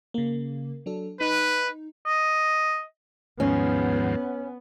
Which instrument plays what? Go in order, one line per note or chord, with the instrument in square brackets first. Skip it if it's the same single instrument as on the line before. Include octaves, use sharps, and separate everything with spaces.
[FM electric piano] C#3 A#3
F#3 D4 A4
[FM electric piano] D#4 [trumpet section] B4
[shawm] D#5
[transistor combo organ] D#2 G#2 F3 [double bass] B3 [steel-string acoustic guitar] C#4